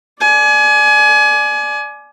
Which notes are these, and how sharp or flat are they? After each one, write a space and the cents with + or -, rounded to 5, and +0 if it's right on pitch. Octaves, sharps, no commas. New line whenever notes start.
D5 +5 G#5 +30